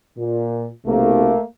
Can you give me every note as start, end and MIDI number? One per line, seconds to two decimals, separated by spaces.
0.17 0.68 46
0.87 1.33 35
0.87 1.33 48
0.87 1.42 57
0.87 1.42 58